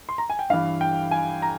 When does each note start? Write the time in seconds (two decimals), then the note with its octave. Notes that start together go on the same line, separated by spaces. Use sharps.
0.09 C6
0.18 A#5
0.30 G#5
0.39 G5
0.50 G2 E3 F5
0.81 G5
1.11 G#5
1.42 A#5